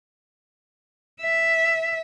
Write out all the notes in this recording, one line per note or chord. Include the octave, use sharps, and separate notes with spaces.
E5